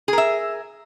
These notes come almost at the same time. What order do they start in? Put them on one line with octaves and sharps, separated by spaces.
G#4 A#4 E5